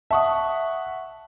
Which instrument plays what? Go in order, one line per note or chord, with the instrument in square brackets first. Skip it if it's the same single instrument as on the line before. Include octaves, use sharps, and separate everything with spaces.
[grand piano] E5 F#5 [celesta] A5 C#6 D#6